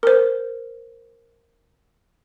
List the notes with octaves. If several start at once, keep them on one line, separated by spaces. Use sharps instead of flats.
A#4 C5